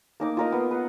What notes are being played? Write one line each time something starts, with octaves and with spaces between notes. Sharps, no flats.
A#3 D#4 D6
F4 A#4 D#5
B3
B4 F#5